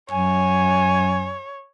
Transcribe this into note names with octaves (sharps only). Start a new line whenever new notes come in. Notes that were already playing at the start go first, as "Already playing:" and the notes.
F#2 C#5 G#5